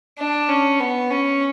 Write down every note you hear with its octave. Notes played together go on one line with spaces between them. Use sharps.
D4
C#4
B3
C#4